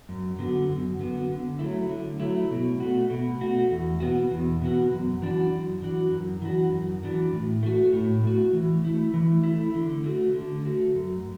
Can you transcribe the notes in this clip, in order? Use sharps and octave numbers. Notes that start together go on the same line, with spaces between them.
F#2
D3 B3 F#4
F#2
D3 B3 F#4
D3
F#3 A3 E4
D3
F#3 A3 E4
B2
A3 F#4
B2
A3 F#4
E2
B2 B3 F#4
E2
B2 B3 F#4
F#2
E3 D4 F#4
F#2
E3 D4 F#4
F#2
E3 D4 F#4
F#2
E3 D4 F#4
A2
A3 F#4
A2
A3 F#4
E3
A3 E4
E3
A3 E4
D3
A3 F#4
D3
A3 F#4
F#2